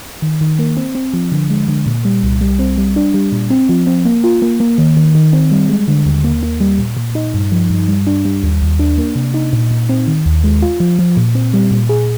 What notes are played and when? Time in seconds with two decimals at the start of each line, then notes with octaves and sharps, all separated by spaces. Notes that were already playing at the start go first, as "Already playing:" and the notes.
0.22 D#3
0.41 D#3
0.59 A#3
0.77 C4
0.95 C4
1.14 F3
1.32 D3
1.50 G#3
1.68 D3
1.86 A#2
2.05 G3
2.23 C2
2.41 G3
2.59 C4
2.77 G3
2.96 D4
3.14 G3
3.32 A#2
3.50 C4
3.69 F3
3.87 C4
4.05 A#3
4.24 F4
4.42 A#3
4.60 A#3
4.78 D#3
4.97 D#3
5.15 D#3
5.33 C4
5.51 G3
5.69 G#3
5.88 D3
6.06 D#2
6.24 A#3
6.43 A#3
6.60 G3
6.79 A#2
6.97 A#2
7.15 D#4
7.34 G2
7.52 F3
7.70 G2
7.88 G3
8.07 D4
8.25 G3
8.43 D#2
8.62 D#2
8.79 D4
8.98 A#3
9.16 C3
9.34 D#4
9.53 A#2
9.71 A#2
9.89 C4
10.07 D#3
10.26 D#2
10.44 G#3
10.62 F4
10.80 F3
10.99 F3
11.17 A#2
11.35 C4
11.54 G3
11.71 A#2
11.89 G#4